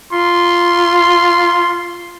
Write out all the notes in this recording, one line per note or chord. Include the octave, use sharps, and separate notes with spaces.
F4 C6